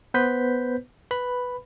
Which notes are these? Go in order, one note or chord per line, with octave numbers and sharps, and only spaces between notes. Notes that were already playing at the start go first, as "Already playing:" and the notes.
B3 B4 C5 G6 B6
B4 B5